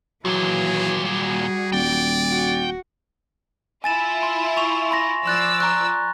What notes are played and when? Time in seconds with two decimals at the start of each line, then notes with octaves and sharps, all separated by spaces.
0.25 D#2 A#2 E3 F#3 G#4
1.05 G3 F#4 G#4
1.72 D#1 D5 G5
2.30 F#4
3.84 E4 F4 G#5 A6 E7
4.23 C6
4.57 C#6 F7
4.91 B5 C6 A#6
5.26 F3 D5 C6 E6 F#6 A6
5.60 A#5 C#6 F#6